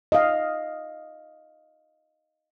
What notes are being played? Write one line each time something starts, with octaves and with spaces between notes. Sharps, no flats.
D#5 F5